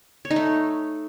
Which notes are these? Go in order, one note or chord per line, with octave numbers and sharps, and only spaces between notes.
C#5
D#4
A3